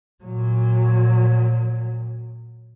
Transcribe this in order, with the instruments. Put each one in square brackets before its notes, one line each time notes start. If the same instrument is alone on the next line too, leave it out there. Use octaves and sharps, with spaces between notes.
[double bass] A#2 F#3